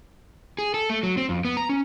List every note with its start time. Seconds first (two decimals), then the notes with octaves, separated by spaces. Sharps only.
0.58 G#4
0.74 A4
0.89 A3
1.03 F#3
1.17 C4
1.29 F2
1.45 B3
1.57 A#5
1.69 C#4